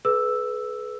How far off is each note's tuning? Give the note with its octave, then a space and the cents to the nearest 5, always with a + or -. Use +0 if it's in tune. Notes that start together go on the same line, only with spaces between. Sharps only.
G#4 +45 B4 +0 E6 +0